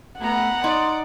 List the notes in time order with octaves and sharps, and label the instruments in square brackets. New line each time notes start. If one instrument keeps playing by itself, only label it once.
[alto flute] A3 [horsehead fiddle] B3 A#5 [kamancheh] F#5
[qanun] D#4 [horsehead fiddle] D5 [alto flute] C6